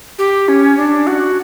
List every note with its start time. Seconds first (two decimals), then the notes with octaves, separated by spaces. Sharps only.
0.19 G4
0.48 C#4
0.77 D4
1.07 F#4